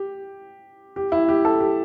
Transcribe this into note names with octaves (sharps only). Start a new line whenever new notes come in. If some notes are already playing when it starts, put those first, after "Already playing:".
Already playing: G4
G4
E4
G4
A4
G4